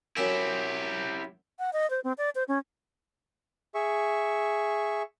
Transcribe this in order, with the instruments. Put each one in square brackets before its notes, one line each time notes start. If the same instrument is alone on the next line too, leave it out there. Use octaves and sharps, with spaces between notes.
[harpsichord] F#2 A4 [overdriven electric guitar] E4 G4
[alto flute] F#5
D#5
C5
C4
D5
C5
C#4
[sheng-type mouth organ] G#4 E5 C#6